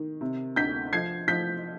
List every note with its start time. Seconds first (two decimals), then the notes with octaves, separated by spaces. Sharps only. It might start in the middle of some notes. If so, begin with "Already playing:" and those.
Already playing: D#3
0.21 C3
0.56 D2 G6 B6
0.93 F3 G#6 C7
1.28 F3 G6 B6